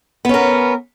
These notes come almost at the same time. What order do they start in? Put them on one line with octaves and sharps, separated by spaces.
B3 C#4 A#4